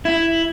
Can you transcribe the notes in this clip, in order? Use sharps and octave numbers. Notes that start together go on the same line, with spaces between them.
E4